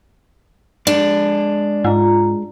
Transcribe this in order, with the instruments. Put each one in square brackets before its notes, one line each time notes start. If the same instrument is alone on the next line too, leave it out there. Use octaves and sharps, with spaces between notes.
[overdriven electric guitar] G#3 D5 [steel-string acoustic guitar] D4
[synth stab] G#2 [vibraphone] F4 A#5